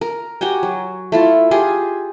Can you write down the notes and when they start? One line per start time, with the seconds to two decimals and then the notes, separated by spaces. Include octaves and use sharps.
0.01 A#4
0.41 F#4 G4 G5 G#5
0.63 F#3
1.12 A3 E4 F4
1.51 F4 G4 G#4 G#5